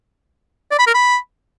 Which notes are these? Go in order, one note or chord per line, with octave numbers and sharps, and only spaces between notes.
D5
B5
A#4
B5